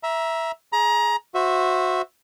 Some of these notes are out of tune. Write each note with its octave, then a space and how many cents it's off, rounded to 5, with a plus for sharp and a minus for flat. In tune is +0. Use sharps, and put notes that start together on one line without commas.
E5 +0 A#5 +25
G#4 +15 A#5 +25
F#4 -15 C5 +0 E5 +0